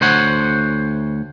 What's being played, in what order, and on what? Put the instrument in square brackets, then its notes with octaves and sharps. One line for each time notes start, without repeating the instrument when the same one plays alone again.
[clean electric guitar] D2 C5 C#5 F#5